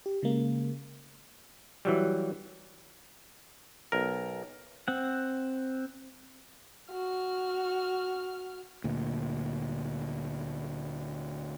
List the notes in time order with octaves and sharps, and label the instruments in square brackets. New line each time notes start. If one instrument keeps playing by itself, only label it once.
[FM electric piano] G4
C#3 G#3 A#3
[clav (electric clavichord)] E3 F#3 G3
B1 A#4
[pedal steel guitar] C4 F#5
[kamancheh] F#4 F6
[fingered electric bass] D2 A#2